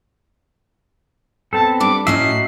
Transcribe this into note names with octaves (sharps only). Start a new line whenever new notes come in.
B3 C4 A4 A5
G3 D4 D6
A2 C#4 D#4 F#4 D#5 E5 C7